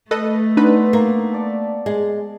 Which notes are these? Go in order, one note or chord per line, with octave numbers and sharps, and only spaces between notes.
A3 A4 B4 D#5
B3 D4 D#4 B4 C5
A#3
A4 D5 A5
G#3